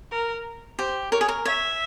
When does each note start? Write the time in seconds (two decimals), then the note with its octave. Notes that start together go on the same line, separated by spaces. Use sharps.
0.11 A#4
0.79 G4 C5
1.12 A#4 C#5
1.21 G#4
1.28 A#4
1.45 C#5 E5